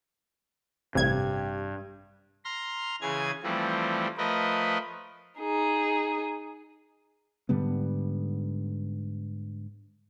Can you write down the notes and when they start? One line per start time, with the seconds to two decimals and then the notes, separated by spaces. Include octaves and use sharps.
0.95 A1 G2 C3 G4 G#6
2.45 A#5 C6 F6
3.01 C#3 E3 G#4 G#5 G#6
3.43 E3 F3 G3 A3 C4
4.17 F3 A3 A#4 B4 D#5
5.39 D#4 G#4
7.49 G#2 D3 G3 B3